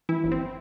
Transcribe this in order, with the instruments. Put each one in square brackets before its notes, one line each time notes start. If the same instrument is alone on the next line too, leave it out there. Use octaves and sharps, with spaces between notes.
[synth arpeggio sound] E3 E4
G1
C4